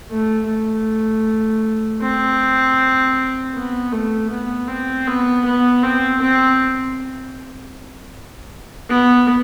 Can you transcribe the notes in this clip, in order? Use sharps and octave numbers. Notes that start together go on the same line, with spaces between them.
A3
A3
C4
B3
A3
B3
C4
B3
B3
C4
C4
B3